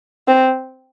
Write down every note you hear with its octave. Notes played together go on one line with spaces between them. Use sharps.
C4